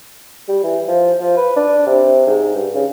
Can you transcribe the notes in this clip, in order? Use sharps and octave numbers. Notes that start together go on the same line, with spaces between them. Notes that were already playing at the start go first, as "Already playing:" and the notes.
G3
E3
F3
F3
B4
D4
C3
G#2
G2
C#3